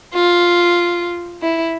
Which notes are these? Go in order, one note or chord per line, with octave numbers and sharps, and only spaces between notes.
F4
E4